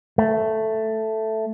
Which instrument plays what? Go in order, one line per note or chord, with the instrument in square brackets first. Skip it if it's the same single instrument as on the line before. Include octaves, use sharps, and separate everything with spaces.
[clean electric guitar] A3